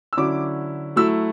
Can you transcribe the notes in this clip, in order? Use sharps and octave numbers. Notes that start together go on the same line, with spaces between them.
E6
D3 F#3 C#4 E4 D6
F#3 A3 E4 E6